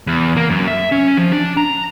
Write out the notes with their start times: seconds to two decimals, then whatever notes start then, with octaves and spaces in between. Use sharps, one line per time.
0.07 E2
0.37 A#3
0.50 F#2
0.67 E5
0.92 C#4
1.17 F3
1.32 D4
1.57 A#5